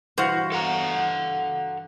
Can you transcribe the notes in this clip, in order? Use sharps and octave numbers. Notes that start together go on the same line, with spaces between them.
G2 E3 F#4 C5 F5
A4 F#5 A#5